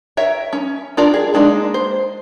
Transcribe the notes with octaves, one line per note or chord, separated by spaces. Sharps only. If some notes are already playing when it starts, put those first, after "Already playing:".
A#4 C#5 E5
C#4
D4 F4 A#4 D5
G#4
G#3 A#3 D4 D#4
C5